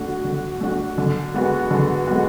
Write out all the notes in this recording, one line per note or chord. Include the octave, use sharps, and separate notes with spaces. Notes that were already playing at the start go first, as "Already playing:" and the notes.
Already playing: D3 A3 D4 F#4
D3
A3 D4 F#4
D3
G#3 B3 F#4
D3
G#3 B3 F#4